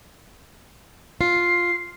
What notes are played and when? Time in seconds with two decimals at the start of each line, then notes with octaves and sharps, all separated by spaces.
1.21 F4 C7